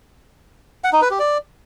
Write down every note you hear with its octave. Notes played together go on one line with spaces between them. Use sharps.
F#5
D#4
B4
G4
D5